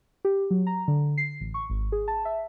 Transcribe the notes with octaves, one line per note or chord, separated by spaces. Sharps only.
G4
F#3
A#5
D3
C7
A1
C#6
G#1
G#4
A5
E5